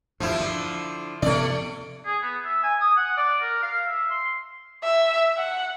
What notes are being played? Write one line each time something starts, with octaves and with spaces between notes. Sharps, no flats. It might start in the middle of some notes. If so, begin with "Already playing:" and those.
E2 G2 F3 E4
D3
C3 F3 A3 B3 D5
G#4
B3
E5
G#5
D#6
F#5
D5
A#4
F5
E5
C6
E5
F#5